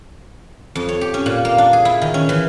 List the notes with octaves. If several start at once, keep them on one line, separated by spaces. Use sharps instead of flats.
F2
C#5
G4
C#4
A#2
A#3
D4
G#4
E4
D#3
C#4
E3